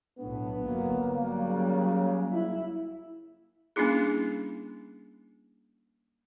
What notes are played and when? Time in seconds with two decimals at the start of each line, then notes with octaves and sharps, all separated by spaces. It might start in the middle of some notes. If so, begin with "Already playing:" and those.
0.19 B1 A2 B3 D4
0.63 G1 F#3 A#3
1.14 F#3 G3
1.44 C#3
2.31 E4
3.76 G3 A#3 C#4 D4 E4 G#4